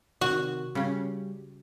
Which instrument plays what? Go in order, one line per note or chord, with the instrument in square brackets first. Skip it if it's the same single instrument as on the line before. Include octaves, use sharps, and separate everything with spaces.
[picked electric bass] C3 D#3 [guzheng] F#4
[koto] C#3 C#4 [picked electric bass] G3